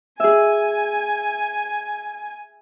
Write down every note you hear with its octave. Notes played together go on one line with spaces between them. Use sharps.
G#4 E5 G#5